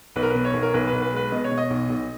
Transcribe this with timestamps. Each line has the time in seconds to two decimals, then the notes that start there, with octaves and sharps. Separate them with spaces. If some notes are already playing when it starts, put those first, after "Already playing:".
0.16 B1 B4
0.22 A#4
0.30 B4
0.35 B2
0.45 C#5
0.54 B1
0.62 A#4
0.74 B1 B4
0.87 B4
0.93 B1
1.02 B4
1.12 G#3 B4
1.32 B2 D#5
1.44 C#5
1.51 B2
1.58 D#5
1.70 B1
1.89 B1